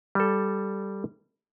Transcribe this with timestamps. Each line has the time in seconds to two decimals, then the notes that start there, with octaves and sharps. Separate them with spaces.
0.15 G3 A4